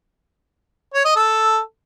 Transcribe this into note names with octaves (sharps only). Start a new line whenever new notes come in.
C#5
D#5
A4